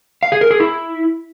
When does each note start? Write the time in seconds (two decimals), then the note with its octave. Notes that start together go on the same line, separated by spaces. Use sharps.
0.23 F5
0.32 G#4
0.41 A#4
0.51 G#4
0.60 E4